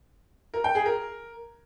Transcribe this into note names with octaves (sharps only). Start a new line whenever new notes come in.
A#4
G5
G#4
A#4